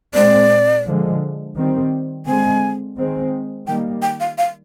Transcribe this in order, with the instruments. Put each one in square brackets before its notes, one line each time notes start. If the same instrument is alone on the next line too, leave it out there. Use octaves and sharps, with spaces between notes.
[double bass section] A#2 G#3 C4 [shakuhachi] D5
[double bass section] D3 F3 G#3
D#3 G3 C4
[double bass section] D3 G#3 C4 [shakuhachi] G#5
[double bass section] D#3 G#3 C4
[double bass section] D#3 G3 A#3 [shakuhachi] G5
[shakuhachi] G5
F5
F5